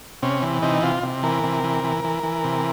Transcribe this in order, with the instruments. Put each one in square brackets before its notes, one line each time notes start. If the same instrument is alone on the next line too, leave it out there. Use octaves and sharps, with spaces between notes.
[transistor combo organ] C3 C#4
E3
C3 D#4
C3 F4
C3
E3 A#4
C3
E3
E3
E3
E3
C3